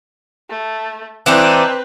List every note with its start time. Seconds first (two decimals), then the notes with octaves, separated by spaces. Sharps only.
0.49 A3
1.26 E3 C4 D4 D#4 B4